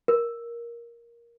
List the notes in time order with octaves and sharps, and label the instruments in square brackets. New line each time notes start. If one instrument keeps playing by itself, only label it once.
[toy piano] A#4